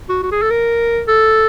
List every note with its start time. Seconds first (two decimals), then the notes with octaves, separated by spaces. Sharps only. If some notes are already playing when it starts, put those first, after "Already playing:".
0.09 F#4
0.23 F#4
0.32 G#4
0.42 A4
0.51 A#4
1.08 A4